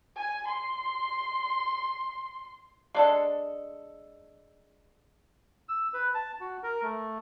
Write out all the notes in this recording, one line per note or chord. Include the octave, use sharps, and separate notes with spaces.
G#5
C6
G#3 D4 A4
E6
B4
A5
F#4
A#4
A3